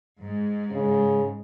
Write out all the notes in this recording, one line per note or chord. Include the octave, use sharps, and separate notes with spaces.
G#2
C#3